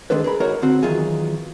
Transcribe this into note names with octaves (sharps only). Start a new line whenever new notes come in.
D#3 G#3 D4 A4 B4
G#4 A#4 B5
G#3 D#4 F#4 G#4 A#4 C#5
D3 C4 F#4
E2 D#3 F#3 F4 G#4